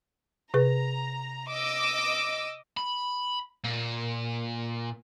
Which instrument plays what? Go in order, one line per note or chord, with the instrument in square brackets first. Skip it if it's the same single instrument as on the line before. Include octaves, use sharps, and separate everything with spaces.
[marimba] C3 G#4 B4 [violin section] A#5
[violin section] D#5 D6 E6
[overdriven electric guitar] B5
A#2